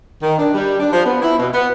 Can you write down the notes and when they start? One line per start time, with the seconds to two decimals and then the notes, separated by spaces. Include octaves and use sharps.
0.23 D#3
0.38 D4
0.54 G3
0.80 D4
0.92 F3
1.06 B3
1.22 E4
1.39 B2
1.54 B3